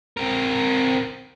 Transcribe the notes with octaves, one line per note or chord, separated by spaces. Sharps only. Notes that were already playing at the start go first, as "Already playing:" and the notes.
C4 A#4